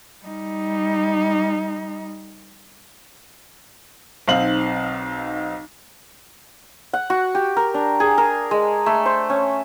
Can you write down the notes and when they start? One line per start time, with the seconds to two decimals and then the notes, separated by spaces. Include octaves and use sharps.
0.24 G3 D#4
4.28 B1 C4 D#4 F5 F#7
6.93 F#5
7.10 F#4
7.35 G4
7.57 A#4
7.74 D4
8.00 G#4
8.18 A#4
8.51 G#3
8.86 A3
9.06 C5
9.30 C#4